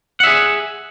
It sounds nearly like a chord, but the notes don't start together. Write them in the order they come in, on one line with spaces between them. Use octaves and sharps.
F#5 E5 G#4